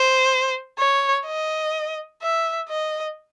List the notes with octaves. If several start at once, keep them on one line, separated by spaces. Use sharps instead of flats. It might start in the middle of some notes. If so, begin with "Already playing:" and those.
Already playing: C5
C#5
D#5
E5
D#5